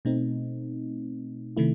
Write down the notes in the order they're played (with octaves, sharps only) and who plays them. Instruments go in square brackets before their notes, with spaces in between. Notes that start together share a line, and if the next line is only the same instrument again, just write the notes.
[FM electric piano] B2 A3 C4 D#4
C3 D#3 A3 E4